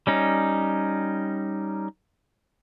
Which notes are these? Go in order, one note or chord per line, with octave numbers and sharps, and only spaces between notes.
G3 C#4 D#4